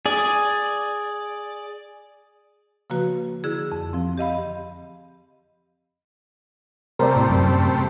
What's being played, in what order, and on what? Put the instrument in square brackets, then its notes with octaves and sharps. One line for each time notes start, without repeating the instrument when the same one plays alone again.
[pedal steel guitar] G#4 D5
[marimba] C#3 F3 A#3 F#4 B4
D3 E4 G#4
F2
F3 C4
G4 D#5 F5 B5
[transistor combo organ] C3 G3 A3 [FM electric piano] A#4 C5 D5
[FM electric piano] A2
F#2